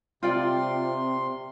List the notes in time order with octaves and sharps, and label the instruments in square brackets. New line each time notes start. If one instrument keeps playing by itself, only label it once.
[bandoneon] C3 C6 [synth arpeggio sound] C4 [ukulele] F4 D5 G5